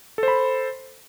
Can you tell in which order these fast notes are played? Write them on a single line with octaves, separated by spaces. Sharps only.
A4 C5 B5